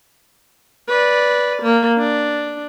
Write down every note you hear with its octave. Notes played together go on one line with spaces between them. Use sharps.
B4 D5
A#3
D4